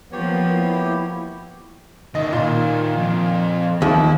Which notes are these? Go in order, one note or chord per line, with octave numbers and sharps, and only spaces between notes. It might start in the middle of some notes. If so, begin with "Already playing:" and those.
F3 A#3 B3 G4 C#5
E4
D#3 D#5 E5
A#2
F2
D#2 F3 E4 E5